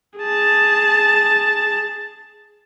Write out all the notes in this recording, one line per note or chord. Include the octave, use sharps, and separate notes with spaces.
G#4 A5